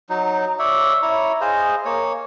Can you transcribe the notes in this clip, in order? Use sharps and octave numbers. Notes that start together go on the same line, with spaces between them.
F#3 D#4
C#5 D5 E5
E4 C#5 A#5
G#4 C5 D#5 F5
A#3 C#5